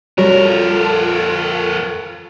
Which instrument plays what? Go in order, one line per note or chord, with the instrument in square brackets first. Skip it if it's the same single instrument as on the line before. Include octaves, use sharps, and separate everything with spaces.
[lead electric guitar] F2 A#4 [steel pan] G3 C#5 [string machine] F4 A4 [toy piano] F#4